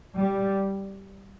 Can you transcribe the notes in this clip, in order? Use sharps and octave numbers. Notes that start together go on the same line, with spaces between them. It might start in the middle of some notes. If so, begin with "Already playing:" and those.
G3